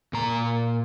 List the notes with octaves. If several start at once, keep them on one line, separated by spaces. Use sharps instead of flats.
A#2 A#5